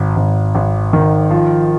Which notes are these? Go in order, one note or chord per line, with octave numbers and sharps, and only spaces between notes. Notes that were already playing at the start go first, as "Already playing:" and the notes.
Already playing: G#1
G#1
G#1
D#3
F3